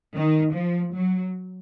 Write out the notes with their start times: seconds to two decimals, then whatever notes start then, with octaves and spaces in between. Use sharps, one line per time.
0.14 D#3
0.53 F3
0.93 F#3